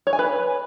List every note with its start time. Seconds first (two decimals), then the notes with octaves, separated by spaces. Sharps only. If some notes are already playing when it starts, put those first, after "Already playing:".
0.07 C#5
0.13 G#5
0.19 B4